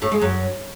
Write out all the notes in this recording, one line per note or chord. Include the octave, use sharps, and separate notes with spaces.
A2
G#3
F#2